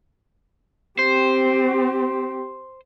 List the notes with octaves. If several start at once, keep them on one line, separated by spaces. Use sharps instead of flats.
C4 G4 C5